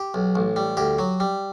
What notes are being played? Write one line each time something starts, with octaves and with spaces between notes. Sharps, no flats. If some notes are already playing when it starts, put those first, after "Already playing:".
Already playing: G4
B1
A1
G3
D2 G4
F#3
G3